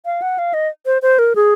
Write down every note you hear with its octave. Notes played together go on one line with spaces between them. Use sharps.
F5
F#5
F5
D#5
C5
C5
A#4
G#4